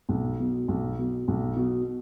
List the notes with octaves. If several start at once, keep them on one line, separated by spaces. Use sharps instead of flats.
B1
B2
B1
B2
B1
B2